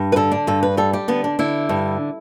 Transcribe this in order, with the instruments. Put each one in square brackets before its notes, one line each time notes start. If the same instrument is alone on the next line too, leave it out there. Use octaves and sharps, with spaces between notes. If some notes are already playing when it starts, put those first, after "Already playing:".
Already playing: [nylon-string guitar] G2
B4
D3 A4
D4
G2 A4
B4
G3 A4
G4
D3 B3
D4
D3 E4
G2